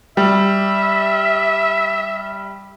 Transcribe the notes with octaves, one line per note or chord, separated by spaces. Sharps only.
G3 E5